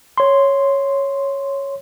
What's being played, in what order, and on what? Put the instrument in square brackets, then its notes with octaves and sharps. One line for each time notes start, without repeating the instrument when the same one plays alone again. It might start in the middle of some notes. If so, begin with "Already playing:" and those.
[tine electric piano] C#5 C6